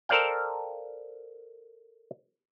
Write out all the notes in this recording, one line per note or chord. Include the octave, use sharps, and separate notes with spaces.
A4 A#4 C5 D5 F5 G5